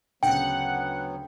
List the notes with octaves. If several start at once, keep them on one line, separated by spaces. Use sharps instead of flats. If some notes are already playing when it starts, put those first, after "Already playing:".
D2 C#3 F#3 B3 F#5 G5